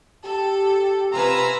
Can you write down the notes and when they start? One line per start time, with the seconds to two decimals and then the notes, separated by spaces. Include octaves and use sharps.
0.25 G4 A4
1.13 C3 F4 B4 G#5 A#5 E6